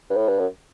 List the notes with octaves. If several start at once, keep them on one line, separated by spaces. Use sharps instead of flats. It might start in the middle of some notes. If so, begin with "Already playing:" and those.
G2
A2
G2
F#2